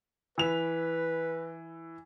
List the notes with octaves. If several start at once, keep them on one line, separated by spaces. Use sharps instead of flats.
E3 B4 F7